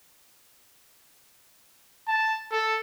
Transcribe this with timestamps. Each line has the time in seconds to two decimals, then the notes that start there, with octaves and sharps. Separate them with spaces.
2.08 A5
2.51 A4